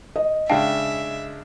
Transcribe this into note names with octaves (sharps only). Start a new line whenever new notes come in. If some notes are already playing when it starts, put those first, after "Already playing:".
D#5
C#3 G#3 D4 E5 F5 G5 A5